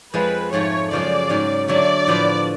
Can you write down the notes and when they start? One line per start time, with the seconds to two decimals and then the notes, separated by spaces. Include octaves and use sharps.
0.14 F2 F3 G#3 B4
0.52 G#2 F3 A3 C#5
0.91 F#2 C#3 F3 G#3 D5
1.29 G#2 F#3 C#4
1.68 D3 F#3 A3 D5
2.07 A2 F3 B3 F4 B4